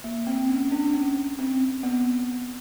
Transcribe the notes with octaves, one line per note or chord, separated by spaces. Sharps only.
A#3
C4
C#4
D4
C#4
C4
B3